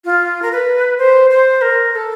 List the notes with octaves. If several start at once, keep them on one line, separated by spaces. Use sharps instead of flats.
F4
A#4
B4
C5
C5
A#4
A#4
A4